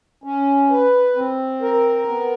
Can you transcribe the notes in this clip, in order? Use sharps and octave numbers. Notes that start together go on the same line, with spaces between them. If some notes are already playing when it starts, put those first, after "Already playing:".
C#4
B4
C4
A#4
B3